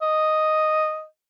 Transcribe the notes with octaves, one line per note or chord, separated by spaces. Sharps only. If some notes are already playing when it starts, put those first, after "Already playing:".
D#5